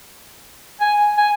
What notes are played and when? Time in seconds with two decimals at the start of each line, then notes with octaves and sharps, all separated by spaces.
0.81 G#5
1.17 G#5